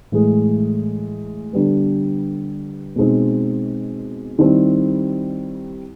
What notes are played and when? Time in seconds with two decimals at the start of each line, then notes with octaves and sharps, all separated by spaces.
0.12 A2 E3 G#3
1.53 D3 G3 B3
2.96 B2 G#3 C4 D#4
4.39 D#3 G3 C4 E4 G4